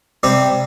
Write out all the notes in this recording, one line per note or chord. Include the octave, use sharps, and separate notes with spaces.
C3 G3 C4 G4